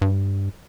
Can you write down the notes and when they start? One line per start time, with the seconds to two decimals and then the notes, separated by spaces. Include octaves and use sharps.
0.02 G2